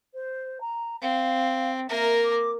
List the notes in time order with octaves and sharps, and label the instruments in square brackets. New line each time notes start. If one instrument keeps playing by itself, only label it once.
[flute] C5
A#5
[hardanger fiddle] C4 [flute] F5
[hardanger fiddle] A#3 A#4 [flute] E5
[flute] D6